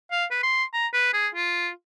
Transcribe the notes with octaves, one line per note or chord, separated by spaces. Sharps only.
F5
B4
C6
A#5
B4
G#4
F4